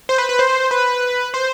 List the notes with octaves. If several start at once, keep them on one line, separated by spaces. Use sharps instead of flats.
C5
B4
B4
C5
B4
C5